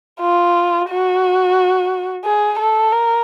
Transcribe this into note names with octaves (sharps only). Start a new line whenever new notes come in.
F4
F#4
G#4
A4
A#4